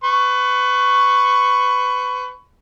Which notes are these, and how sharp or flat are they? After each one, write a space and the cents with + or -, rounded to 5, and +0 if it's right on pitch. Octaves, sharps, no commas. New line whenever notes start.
B4 +25 C#6 +0